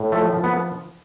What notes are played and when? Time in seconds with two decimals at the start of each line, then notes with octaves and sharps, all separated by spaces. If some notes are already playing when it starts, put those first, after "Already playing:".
Already playing: A2
0.12 F3 A3
0.33 F3
0.44 B3